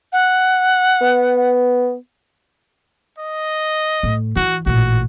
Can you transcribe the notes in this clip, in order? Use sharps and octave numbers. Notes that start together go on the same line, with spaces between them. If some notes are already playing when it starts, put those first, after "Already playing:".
F#5
B3
D#5
A2
E3 F#4
A1 A#2 F#4